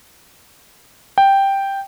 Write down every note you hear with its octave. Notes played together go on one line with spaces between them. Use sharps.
G5